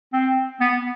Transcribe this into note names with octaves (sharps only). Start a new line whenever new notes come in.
C4
B3